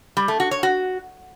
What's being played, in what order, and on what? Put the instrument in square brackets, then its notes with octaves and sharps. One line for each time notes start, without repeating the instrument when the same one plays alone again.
[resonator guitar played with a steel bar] G3
A3
F#4
C#5
F#4